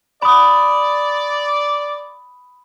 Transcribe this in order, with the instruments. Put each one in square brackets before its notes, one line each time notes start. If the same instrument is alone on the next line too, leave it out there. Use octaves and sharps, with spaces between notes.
[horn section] D5 [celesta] B5 D#6